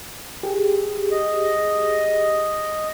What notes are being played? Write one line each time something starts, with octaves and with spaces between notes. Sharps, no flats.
G4 G#4
D#5